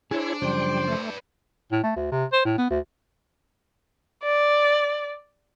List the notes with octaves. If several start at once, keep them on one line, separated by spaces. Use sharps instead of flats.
D4 E4 G#4 C5 C#5
F#2 C#3 F3 G3 C5 G5
A3 B4 D5
A2
A3
D2
C3
C5
A2
B3
D2
D5